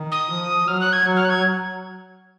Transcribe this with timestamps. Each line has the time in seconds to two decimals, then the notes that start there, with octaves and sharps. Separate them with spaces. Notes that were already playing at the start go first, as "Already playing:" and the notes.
Already playing: D#3
0.12 D#6
0.30 F3
0.68 F#3 F6
0.80 F#6
0.93 G#6
1.04 F#3
1.16 F6
1.25 F#6
1.30 G#6